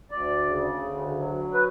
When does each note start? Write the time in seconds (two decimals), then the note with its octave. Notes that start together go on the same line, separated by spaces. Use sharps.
0.11 D2 D5
0.47 C#3
0.83 D2
1.18 F#3
1.54 B4